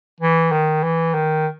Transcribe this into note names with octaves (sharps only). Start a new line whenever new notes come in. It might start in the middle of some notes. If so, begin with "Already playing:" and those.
E3
D#3
E3
D#3